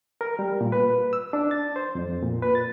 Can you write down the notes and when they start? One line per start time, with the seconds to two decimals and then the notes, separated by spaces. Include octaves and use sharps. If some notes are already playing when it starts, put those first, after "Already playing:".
0.21 A#4
0.39 G3
0.61 A#2
0.72 B4
1.13 E6
1.33 D4
1.51 A6
1.76 C5
1.95 F2
2.23 A#2
2.42 B4
2.55 A6